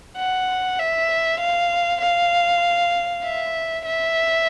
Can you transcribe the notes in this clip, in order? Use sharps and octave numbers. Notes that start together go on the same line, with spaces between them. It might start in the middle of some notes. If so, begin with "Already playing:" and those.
F#5
E5
F5
F5
E5
E5